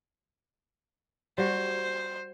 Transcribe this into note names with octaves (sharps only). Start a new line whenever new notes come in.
G3 F#4 C5